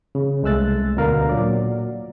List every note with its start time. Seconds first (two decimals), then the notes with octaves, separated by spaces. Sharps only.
0.15 C#3
0.43 C2 G#3 A3 E6 F#6 A6
0.97 D2 B2 D3 A#4 F5
1.29 A#2 F#3 D5